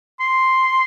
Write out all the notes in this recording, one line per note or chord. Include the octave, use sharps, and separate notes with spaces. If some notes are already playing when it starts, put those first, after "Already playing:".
C6